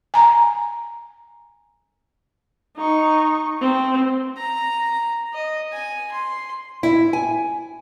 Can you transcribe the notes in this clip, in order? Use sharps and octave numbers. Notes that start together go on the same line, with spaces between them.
G#5 A#5
D#4 C#6
C4
A#5
D#5
G#5
C6
E4
G#5